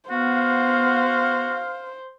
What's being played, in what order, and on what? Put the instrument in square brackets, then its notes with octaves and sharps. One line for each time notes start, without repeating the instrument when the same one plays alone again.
[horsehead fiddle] B3 [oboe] F#4 [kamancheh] C5 [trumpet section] F5